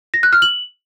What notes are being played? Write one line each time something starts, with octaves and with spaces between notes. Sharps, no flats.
A#6
F#6
F6
F#7